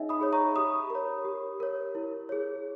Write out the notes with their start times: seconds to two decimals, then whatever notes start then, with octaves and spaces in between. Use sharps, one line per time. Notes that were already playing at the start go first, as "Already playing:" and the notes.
Already playing: D#4 G#4 C#5 D#5 E5 G5
0.09 B5 D#6
0.21 G#4 C#5
0.33 A#5 C#6
0.55 G4 B5 D#6
0.90 A#4 C#5
1.25 G4
1.60 A#4 C#5
1.95 E4
2.29 G#4 C#5